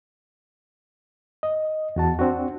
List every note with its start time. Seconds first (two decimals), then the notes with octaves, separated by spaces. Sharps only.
1.43 D#5
1.96 E2 F#4 A5
2.19 C4 D4 F#4